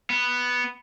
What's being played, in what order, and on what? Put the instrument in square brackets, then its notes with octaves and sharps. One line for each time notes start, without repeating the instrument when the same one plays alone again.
[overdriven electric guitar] B3